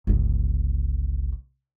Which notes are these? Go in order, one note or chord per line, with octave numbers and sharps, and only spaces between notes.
G1 C#2